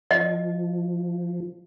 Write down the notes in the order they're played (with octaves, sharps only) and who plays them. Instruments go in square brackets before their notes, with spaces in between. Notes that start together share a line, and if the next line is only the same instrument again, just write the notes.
[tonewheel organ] F3 [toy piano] D#5